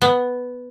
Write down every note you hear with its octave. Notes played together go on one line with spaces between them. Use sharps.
B3